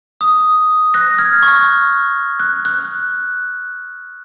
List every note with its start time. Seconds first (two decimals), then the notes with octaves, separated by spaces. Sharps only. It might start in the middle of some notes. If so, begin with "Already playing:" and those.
0.21 D#6
0.94 F#6 A#6
1.18 F6 G#6
1.43 C#6
2.40 F#6
2.65 F#6